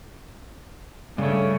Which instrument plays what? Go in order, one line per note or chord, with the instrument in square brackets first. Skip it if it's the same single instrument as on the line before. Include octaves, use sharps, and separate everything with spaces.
[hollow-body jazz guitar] G2 A3 [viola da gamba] C#3